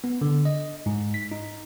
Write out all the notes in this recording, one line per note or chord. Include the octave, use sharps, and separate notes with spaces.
B3
D3
D#5
G#2
B6
D#4